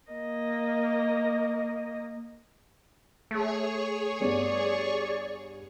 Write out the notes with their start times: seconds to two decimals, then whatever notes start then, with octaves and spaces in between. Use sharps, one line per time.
0.11 A#3 D#5
3.31 A3 G#4 C#5 C#6
4.21 G2 B3 D5